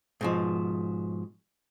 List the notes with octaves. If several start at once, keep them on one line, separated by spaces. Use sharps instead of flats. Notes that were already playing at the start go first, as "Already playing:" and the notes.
G#2 B2 F3